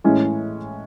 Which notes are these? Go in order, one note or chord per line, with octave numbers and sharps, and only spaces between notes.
A2 E3 G#3 C#4 E4